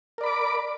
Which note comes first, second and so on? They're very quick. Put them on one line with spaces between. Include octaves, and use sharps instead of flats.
A#4 D5 B5 D6